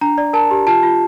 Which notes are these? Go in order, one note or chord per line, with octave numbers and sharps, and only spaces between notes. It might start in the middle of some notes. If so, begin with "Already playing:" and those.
D4 A#5
D5
A#4 A5
G4
F4 A5
F4